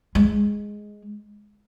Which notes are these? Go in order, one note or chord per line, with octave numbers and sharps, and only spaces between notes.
G#3